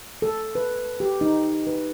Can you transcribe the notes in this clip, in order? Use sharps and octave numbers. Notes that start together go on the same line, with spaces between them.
A4
B4
G4
D#4
B4